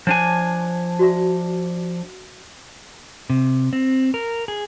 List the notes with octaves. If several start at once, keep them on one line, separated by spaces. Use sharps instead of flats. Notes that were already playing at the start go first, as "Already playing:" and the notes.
F3 D4 C#5 G#5
F#4 D5 E5
C3
C4
A#4
G#4